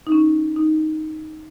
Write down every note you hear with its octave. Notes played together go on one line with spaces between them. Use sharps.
D#4
C#4
D#4